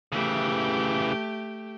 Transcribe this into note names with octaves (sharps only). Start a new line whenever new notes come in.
C#3 E3 A3 G4